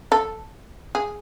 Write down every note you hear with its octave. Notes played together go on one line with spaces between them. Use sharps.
A4
G#4